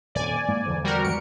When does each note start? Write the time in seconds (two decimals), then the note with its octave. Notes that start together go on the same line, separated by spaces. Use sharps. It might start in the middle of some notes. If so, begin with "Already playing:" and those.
0.15 D#1 F2 D5 G#5
0.48 G#2 A#3
0.66 E2 D3 F3
0.84 G3 F#4 A#4
1.04 E2 G#2 D#3 C#7 D7